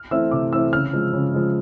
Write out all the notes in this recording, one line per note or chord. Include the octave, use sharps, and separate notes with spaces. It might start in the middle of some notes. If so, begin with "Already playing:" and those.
Already playing: F6
E3 A3 C4 E4 E6
C3 D6
E3 A3 C4 E4 E6
C#3 F6
F3 G#3
C#3
F3 G#3